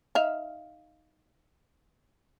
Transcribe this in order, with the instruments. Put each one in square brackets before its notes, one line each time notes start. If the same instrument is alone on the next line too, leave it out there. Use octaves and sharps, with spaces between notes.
[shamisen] D#4 E5 F5